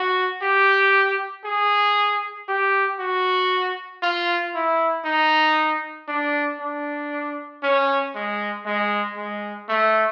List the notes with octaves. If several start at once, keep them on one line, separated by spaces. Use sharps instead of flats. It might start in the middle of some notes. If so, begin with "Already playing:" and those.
Already playing: F#4
G4
G#4
G4
F#4
F4
E4
D#4
D4
D4
C#4
G#3
G#3
G#3
A3